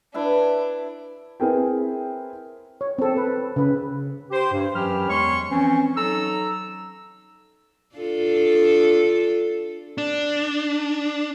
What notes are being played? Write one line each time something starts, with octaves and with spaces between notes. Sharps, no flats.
D4 E4 B4 E5
C4 E4 G#4 A#4 B4 G5
C#5
C4 A4
B4
C#3 B4
G4 C5
G2
F#2 E3 F#3 G4 B5 F6
E2 G#3 C#5 C6 C#6
E3 F3 C4 C#4
F#3 D#4 A4 A#5 E6
D4 F4 A4
D4